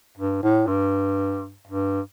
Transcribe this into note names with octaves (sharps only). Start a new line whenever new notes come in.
G2
A2
G2
G2